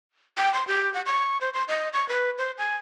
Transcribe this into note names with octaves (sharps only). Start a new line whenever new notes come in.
G5
C6
G4
F#5
C#6
C5
C6
D#5
C#6
B4
C5
G#5